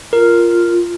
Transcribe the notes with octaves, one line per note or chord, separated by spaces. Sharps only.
F4 A#4